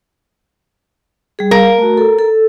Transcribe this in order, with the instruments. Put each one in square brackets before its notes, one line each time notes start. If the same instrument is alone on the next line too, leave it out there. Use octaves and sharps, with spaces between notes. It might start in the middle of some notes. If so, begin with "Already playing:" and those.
[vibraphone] G3 G#4
[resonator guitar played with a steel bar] A#4 [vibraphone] F5
[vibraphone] A3 F#4
A4
A4